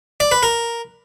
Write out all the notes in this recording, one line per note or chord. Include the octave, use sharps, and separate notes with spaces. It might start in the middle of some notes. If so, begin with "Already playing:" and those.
D5
B4
A#4